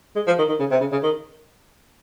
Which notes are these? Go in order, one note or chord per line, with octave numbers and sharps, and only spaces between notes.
G#3
F3
D#3
D#3
C#3
C3
C#3
C#3
D#3